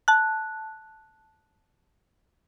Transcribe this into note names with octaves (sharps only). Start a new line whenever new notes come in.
A5 F#6